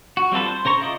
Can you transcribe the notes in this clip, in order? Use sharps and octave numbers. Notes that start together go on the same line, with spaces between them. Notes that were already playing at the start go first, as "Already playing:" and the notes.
F#4
G3 C4 F4 A4 B4
C5
C#3 C5 A#5 C#6
E4 F4 D5 D#5